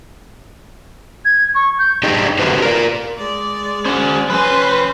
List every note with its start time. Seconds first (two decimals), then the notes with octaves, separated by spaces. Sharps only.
1.25 G#6
1.55 C#6
1.79 G6
2.03 D4 D#4 G4 G#4 D#5 G5
2.39 D3 F#4 G4 B4 C5
2.62 A#4 D5
3.17 G#3 D5
3.86 C#4 F#4 C5
4.30 F3 C#4 B4 C5 G#5